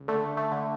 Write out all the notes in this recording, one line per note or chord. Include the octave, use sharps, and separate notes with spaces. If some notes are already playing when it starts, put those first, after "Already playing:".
Already playing: C#2
D3 A3
A3
D3